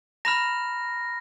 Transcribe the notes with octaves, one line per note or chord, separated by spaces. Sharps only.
A#5 B5 F6 A#6